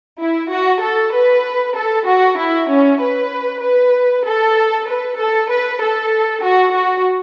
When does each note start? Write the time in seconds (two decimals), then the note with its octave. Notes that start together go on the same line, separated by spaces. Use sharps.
0.20 E4
0.52 F#4
0.82 A4
1.14 B4
1.77 A4
2.07 F#4
2.39 E4
2.70 C#4
3.01 B4
3.64 B4
4.26 A4
4.88 B4
5.19 A4
5.50 B4
5.82 A4
6.44 F#4
6.75 F#4